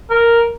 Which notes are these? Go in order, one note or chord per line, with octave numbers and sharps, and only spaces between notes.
A#4